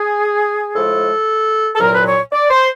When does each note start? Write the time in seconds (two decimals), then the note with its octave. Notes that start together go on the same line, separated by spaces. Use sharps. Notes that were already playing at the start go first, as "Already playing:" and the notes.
Already playing: G#4
0.75 A2 F3 G#3 A4
1.75 A4
1.80 C2 A#2 F#3 A#4
1.93 B4
2.06 C#5
2.32 D5
2.50 C5